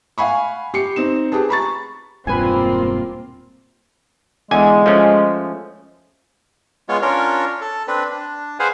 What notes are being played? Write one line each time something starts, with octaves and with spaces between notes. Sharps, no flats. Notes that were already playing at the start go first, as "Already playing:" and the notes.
F5 F#5 G#5 B5 C#6
G4 C7 C#7
C4 D#4 E7
G4 G#4 B4 A5
A#5 B5 C#6 A6
E1 G2 A#2 A#3 C4 F4 B4 G#5
E2 D3 G#3 G#5
F3 A3 C#4
G#3 B3 F4 C#5
C#4 D4 F4 A#4 C#5
A4
C4 D4 B4
D4
G#4 B4 C5 F5 F#5 G#5